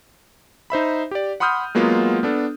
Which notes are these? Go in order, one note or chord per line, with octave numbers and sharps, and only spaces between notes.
D#4 C5 E5 B5
G4 D5
F#5 B5 C6 D#6 F6 G6
F#3 G#3 A#3 B3 F4
B3 D4 A4